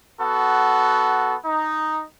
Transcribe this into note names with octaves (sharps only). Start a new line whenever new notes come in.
B3 F#4 A4
D#4